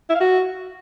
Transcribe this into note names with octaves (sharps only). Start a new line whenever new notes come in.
E4
F5
F#4